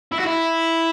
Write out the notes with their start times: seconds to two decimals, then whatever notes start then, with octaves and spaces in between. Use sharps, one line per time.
0.12 E4
0.19 F#4
0.26 E4